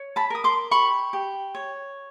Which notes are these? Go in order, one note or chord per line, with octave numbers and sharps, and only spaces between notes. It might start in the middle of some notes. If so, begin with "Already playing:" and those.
Already playing: C#5
A5 B5
A#4 D#6
C6 D6
G4 B5 C#6
G4
C#5